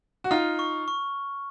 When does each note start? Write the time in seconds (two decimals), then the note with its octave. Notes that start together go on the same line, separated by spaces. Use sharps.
0.24 F#4
0.31 D#4 F4 F6
0.59 C#6
0.88 C#6